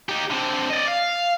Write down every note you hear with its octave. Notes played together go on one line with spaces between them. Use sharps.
D#4 G4
D3 C4
D5 D#5
F5